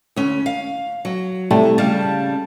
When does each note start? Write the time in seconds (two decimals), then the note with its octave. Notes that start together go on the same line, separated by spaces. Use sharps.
0.16 D2 C#4
0.46 F5
1.05 F#3
1.51 A2 C3 G3 A3
1.78 C#3 G3 F5 A5